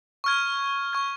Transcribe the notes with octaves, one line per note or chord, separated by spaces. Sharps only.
C#6 F6 G#6
C#6 F6 G#6